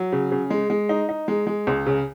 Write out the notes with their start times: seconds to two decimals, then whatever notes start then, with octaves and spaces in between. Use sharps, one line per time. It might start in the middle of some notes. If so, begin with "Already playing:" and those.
Already playing: F#3
0.12 C#3
0.32 C#3
0.50 G#3
0.70 G#3
0.89 D#4
1.09 D#4
1.28 G#3
1.47 G#3
1.67 C#2
1.86 C#3